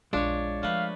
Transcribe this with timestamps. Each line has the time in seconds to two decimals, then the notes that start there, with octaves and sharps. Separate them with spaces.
0.13 A#1 E2 G#3 D4 F4 C#5
0.63 F3 A3 B4 F5